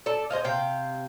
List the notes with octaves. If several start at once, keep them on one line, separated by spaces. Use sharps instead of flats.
A4 D5 A5
G#4 C5 D#5 F5
C3 F5 G5